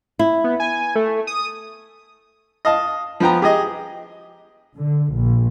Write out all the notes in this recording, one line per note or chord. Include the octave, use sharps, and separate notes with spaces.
E4
B3
G#5
A3
D#6
D#5 F5 A5
F3 B3 G5 A#5
G4 G#4 D#5
D3
A#1